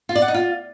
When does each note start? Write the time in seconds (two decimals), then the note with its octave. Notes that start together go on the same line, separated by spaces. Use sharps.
0.09 F4
0.15 D5
0.22 F#5
0.28 D#4
0.34 F4